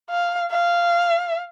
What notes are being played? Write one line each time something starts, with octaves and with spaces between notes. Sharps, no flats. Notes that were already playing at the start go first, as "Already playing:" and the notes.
F5
F5